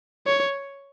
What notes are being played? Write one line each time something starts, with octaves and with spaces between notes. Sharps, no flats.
C#5